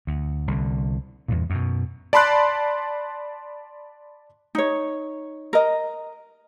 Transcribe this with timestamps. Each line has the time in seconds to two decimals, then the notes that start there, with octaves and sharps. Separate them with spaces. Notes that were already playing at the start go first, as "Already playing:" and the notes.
0.07 D2
0.48 C2 D3
1.28 E2 G2 A#2
1.50 F#2 B2
2.13 D5 A5 B5 C6 F#6
4.55 D#4 C#5
5.53 A#4 D#5